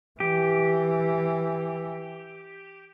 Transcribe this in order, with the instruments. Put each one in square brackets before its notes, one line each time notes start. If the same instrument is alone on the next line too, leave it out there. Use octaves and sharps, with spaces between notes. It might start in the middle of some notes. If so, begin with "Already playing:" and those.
[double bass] E3 [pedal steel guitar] G4